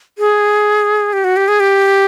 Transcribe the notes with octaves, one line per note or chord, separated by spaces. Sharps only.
G#4
G4
F#4
G4
G#4
G4